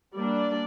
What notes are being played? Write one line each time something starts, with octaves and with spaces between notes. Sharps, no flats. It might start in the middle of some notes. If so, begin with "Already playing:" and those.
G3 A#3 D4 D5